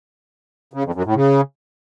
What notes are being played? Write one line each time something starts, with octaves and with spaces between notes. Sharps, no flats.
C#3
F2
F#2
A2
C#3